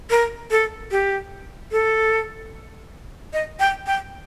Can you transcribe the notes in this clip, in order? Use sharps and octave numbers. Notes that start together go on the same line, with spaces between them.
A#4
A4
G4
A4
D#5
G5
G5